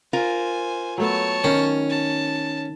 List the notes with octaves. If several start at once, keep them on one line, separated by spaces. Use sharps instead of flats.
F4 A#4 C5 G#5
F#3 A3 B3 C#5 A5
D#3 C#4
A5